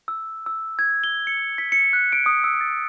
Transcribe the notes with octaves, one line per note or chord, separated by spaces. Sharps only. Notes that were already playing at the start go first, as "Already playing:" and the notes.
E6
E6
G#6
G7
C#7
B6
C#7
F#6
D7
D#6
E6
A6